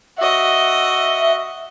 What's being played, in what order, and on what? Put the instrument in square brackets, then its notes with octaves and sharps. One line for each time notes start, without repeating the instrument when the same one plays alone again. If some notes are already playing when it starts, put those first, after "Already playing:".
[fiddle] F#4 D#5 [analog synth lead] E5